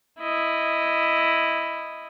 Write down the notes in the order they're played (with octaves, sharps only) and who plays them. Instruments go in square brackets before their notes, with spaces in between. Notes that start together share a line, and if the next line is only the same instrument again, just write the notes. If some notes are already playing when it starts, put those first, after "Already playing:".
[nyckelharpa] E4 D#5